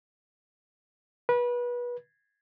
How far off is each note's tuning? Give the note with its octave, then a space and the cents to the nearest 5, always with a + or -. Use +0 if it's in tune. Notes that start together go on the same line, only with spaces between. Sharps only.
B4 -25